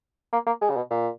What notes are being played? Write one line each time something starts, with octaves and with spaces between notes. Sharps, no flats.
A#3
A#3
G#3
C#3
B2
A#2